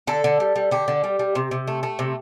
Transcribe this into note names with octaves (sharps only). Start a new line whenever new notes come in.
D3 A4
D3
G3
G3
D3 G4
D3
G3
G3
C3
C3
A3
A3
C3